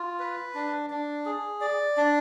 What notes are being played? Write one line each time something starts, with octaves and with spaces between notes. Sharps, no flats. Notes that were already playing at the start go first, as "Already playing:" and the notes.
Already playing: F4
B4
D4
D4
G#4
D5
D4